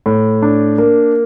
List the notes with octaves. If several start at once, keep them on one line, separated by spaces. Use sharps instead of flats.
A2
D4
A#3